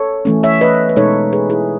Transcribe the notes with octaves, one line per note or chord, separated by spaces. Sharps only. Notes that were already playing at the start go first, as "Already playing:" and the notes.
Already playing: A4 C#5
E3 A3 C#4
C#5 E5
B4 D#5
B4
B2 G#3 D#4 A4 C#5
G#4 B4
E4 G#4